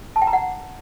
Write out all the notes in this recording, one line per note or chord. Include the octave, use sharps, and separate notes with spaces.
A5
G5
A#5
F#5